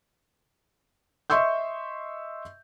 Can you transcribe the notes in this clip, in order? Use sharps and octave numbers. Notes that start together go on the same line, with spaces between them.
D#5 E5 C6 C#6 E6 G6